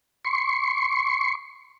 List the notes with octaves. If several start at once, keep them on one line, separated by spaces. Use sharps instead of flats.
C6 C#6